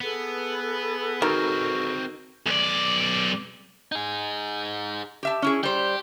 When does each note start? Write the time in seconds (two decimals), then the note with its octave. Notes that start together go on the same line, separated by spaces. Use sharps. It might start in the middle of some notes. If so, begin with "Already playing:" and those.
0.01 B3 G#4 A4 B4
1.22 D#3 C4 F#4 A#4
2.47 B1 D5
3.92 D#4 G#4
5.23 G4 E5 A5
5.42 C#4 E4 G#4
5.63 G3 G4 C5